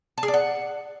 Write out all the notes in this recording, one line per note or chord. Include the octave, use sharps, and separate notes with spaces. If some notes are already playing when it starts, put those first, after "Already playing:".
A5
G#4
D5
F#5